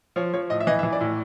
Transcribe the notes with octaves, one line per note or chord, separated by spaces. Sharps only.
F3 C#5
F3 C#5
A2 D#5
E5
E3 D#5
E5
E3
D5
A2